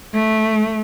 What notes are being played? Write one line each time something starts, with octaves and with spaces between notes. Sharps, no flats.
A3